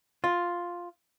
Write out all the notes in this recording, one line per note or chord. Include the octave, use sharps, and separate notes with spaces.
F4